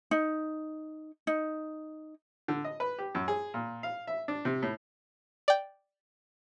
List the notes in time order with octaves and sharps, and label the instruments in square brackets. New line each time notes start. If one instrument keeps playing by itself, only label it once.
[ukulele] D#4
D#4
[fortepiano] D3
D#5
B4
G4
F#2
G#4
A#2
F5
E5
D4
C3
A2
[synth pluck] D5 G5